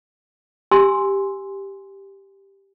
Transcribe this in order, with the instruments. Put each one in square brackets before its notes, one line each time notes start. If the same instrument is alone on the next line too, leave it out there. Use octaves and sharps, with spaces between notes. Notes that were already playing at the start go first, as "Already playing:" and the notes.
[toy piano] G4 G#5 C6 E6